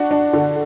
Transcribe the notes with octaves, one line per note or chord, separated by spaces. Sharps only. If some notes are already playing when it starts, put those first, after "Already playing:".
Already playing: D4 F#4
D4
D3